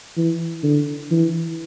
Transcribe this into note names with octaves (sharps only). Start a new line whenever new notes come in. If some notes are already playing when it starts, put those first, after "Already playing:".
E3
D3
E3